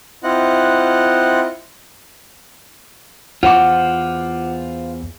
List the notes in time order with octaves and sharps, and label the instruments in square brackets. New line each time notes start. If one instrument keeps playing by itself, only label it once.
[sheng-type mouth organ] C4 E4 F4 D#5 F#5 F#6
[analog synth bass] E2 [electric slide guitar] F4 C5 [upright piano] F#5 D6